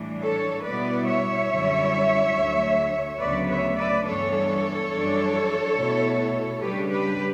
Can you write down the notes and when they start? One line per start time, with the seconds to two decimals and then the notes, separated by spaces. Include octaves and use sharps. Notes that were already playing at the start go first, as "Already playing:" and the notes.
Already playing: A2 E3 G3 D4
0.22 A4 C#5
0.65 B2 G3 B3 E4 B4 D5
1.07 C#5 E5
1.50 F#2 D3 G3 C#4 E4
2.35 D2 D3 F#3 A3
3.21 D2 C#3 F#3 B3 B4 D5
3.49 C#5 E5
3.78 B4 D5
4.06 G2 E3 G3 B3 D4 A4 C#5
4.92 F#2 E3 G3 D4
5.77 B2 A3 E4
6.62 C#3 G3 D4 G4 B4
6.90 G4 B4